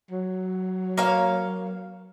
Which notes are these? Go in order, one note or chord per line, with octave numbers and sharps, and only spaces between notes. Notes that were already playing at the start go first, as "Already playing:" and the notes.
F#3
A#3 C#5 F5